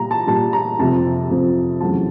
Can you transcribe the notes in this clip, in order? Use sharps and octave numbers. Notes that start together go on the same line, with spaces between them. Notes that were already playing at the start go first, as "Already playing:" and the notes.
Already playing: A#2 G3 A#5
A5
A#2 G3 A5
A#5
F2 C3 F3 A5
F2 C3 F3
E2 C#3 F#3 A3 A5